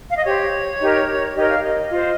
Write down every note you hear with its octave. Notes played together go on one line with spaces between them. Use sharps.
F5
D#5
G4 C5 C#5
D#4 G4 A#4
D#4 G4 A#4 C#5 D#5
F5
D#5
F4 C5